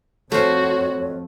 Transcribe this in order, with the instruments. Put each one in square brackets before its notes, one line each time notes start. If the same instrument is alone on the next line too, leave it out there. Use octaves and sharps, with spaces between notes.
[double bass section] F2 [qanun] A3 C5 [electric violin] F#4 [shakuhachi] C#5